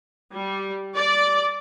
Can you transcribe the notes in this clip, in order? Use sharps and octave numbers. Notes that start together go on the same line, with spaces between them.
G3
D5